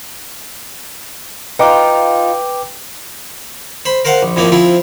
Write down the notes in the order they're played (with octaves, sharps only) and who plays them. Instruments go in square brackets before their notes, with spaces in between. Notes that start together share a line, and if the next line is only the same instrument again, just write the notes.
[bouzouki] D#4 F4 [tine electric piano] B4 G5 D6
[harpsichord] C5 B5
A#4 C5 F5 F#5 A#5
A#1
F2 A2 F3 A#3 C4
F3 C4 E4 F4